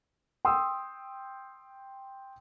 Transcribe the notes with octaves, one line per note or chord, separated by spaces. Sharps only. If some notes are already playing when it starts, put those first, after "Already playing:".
G5 C6 D#6 E6